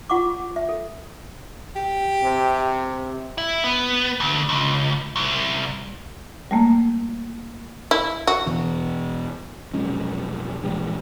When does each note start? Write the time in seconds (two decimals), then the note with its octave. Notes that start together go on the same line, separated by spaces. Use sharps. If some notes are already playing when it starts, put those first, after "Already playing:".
0.10 F4 F#5 C#6 D6
0.56 E5
0.69 A4
1.76 G4
2.23 C3
3.38 E4
3.64 B3
4.20 D2
4.49 C#2
5.16 C2
6.51 G3 A3 A#3
7.91 E4
8.27 F#4
8.46 E2 B2 E3
9.73 F1 B1 G#3 C#4
10.63 A#1 E3 G3 G#3